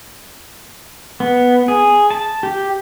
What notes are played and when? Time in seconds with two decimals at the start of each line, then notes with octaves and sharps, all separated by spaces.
1.20 B3
1.68 G#4
2.11 A5
2.43 G4